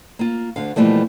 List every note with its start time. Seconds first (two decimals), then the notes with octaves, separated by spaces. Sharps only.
0.19 A#3 F4
0.56 D2 D3 F5
0.76 B2 E3 F3 G3 A3 A#3